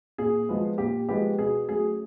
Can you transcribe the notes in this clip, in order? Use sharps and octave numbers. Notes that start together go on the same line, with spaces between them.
A#2 G#4
F3 G#3 B3
A#2 G4
F3 G#3 B3 G4
B2 G#4
F#3 A3 C#4 G#4